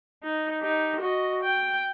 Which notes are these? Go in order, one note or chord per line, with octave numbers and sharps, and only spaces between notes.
D#4
D#4 G4
F#4 D#5
G5